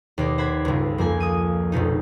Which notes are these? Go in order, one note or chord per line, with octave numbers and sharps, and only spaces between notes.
D#2 B2 D5
C5 F#5 B5 G#6
G1 C#2
F2 A#3 G#5 G#6
D#6 G#6 D#7
F1 A#1 B2 D#4